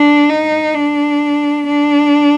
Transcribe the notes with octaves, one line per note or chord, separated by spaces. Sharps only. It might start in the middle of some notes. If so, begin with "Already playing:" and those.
Already playing: D4
D#4
D4
D4